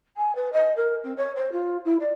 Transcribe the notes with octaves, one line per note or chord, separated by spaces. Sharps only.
G#5
B4
D#5
A#4
C4
C#5
C5
F4
E4
D5